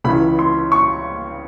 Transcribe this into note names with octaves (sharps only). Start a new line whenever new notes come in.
C#2 C#3 E3 B5
C6
C#6